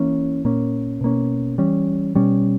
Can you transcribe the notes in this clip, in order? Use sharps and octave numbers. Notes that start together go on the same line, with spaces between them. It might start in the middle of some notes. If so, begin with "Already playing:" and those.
Already playing: E3 A#3 C#4
A#2 A#3 C#4
B2 A#3 C#4
E3 G3 C#4
B2 G3 C#4